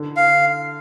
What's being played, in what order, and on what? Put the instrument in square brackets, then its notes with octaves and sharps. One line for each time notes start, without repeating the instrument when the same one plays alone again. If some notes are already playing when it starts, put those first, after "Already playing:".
Already playing: [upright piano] D3
[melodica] F5